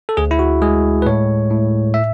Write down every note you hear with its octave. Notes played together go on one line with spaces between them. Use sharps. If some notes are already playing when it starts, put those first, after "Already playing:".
A4
D2 G#4
E4
F#4
G#3 G#4
B4
A2 C#5
A2
E5